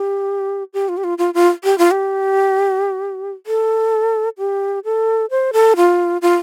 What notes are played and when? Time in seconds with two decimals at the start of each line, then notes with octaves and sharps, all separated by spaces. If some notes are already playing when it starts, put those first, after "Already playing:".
Already playing: G4
0.74 G4
0.89 F4
0.97 G4
1.04 F4
1.18 F4
1.34 F4
1.64 G4
1.78 F4
1.91 G4
3.47 A4
4.38 G4
4.85 A4
5.30 C5
5.53 A4
5.76 F4
6.22 F4